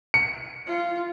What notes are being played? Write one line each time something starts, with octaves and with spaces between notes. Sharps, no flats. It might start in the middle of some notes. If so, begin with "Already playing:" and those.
C#7
F4